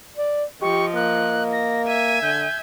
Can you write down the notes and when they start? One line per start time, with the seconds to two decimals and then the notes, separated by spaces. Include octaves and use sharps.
0.17 D5
0.62 F3 G4 D#5 C#6
0.95 A#3 F#6
1.52 A#6
1.87 E5 G#5 D#7
2.22 D3 G6